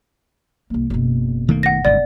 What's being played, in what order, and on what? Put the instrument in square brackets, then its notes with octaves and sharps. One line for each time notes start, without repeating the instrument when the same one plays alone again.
[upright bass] C2 A#3
F#1 B2
[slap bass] D#3 A3 A#3
[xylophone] F#5 A#6
[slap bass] G1 C#2 G#2 [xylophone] D5